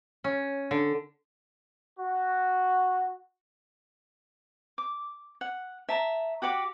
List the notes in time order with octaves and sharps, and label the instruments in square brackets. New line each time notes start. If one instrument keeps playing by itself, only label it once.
[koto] C#4
D3
[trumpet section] F#4
[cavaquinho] D6
F#5
E5 A5 A#5
F#4 G4 F#5 D6